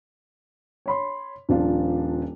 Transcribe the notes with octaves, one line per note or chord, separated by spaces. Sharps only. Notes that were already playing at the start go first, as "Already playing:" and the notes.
C#5 B5 C6
D#1 F3 D4 F4